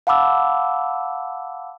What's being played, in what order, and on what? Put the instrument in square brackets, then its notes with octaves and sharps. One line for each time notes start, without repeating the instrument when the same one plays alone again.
[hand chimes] F5 F#5 A5 B5 D6 E6